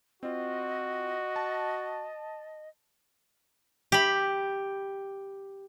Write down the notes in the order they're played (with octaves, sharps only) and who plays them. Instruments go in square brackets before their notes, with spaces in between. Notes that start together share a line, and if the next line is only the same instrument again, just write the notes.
[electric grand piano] C4 F4 [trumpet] F#4 [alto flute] D#5
[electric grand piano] A5
[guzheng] G4 B5